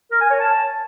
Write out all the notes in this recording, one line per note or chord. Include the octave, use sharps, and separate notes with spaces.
A#4
G#5
C#5
A5